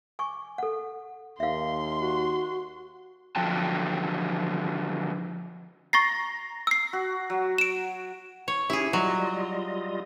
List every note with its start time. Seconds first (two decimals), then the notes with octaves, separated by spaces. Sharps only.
0.19 G#5 C#6 D6
0.58 A4 F#5
1.40 D#2 E5 F5 C6
2.00 F#4
3.36 D3 F3 F#3 G5 A5
5.93 A#5 C#6 A6 C7
6.67 E6 C7
6.93 F#4
7.30 F#3
7.58 D7 E7
8.48 C#5
8.70 C#4 E4 G4 G#4
8.93 F#3 G3 F4 D#5